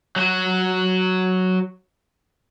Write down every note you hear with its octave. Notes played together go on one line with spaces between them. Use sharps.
F#3 F#4